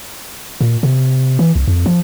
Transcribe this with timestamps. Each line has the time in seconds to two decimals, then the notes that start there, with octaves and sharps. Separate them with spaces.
0.61 A#2
0.83 C3
1.39 E3
1.56 C2
1.67 F2
1.86 F3